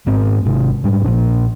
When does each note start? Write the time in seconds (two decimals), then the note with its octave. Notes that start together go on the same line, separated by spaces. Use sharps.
0.07 G#2 B3 C4
0.45 G#1 C3
0.84 G#2 G3
1.05 A#1 A#2 D4